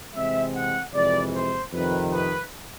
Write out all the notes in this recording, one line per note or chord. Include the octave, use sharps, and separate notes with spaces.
C3 E3 G#3 C4 E5
F#5
F2 C3 E3 G#3 D5
C5
F2 C3 D#3 B4
B4